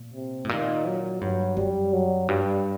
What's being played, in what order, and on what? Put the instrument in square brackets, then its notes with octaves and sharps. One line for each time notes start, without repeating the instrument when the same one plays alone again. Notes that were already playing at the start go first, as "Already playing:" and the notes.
Already playing: [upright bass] A#2
[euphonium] C3
[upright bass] A2
[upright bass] A#2 [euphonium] D#3
[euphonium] F#3
[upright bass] G2 [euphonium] F#3
[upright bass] F#2 [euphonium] G3
[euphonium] F#3
[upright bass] G2 [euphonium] G3